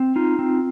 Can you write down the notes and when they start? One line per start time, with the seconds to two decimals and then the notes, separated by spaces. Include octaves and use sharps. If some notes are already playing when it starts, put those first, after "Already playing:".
Already playing: C4
0.16 D#4 F4
0.39 C4